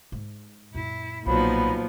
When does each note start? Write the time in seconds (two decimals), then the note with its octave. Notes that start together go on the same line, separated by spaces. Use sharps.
0.12 G#2 G#3
0.75 F#2 A#2 E4
1.26 B1 A#2 F3 F#3 B3 D#4 B5